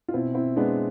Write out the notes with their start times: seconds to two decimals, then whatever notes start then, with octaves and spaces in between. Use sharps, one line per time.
0.08 F4
0.13 B2 C4 E4
0.34 C4 E4
0.56 G#3 B3 D4